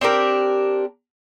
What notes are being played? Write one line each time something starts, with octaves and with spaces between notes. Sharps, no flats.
C4 D4 G4 A#4